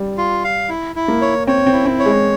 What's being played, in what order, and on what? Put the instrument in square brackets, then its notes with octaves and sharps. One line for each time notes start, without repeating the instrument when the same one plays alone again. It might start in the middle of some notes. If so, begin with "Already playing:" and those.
Already playing: [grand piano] G3
[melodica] F4
F5
E4
E4
[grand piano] A#3
[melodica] C#5
[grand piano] C4 [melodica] C#5
[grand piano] C4
[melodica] E4
[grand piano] C4
[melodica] C#5
[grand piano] G#3